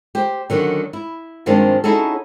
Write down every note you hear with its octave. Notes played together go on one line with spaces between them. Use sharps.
G4 C5
D3 D#3 F#3 C#4
E4
G2 D#3 F3 G#3 C4 D4
C#4 D#4 E4 F#4 G#4 A4